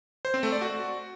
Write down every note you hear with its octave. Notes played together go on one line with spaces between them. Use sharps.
C5
C4
A3
D5
F#4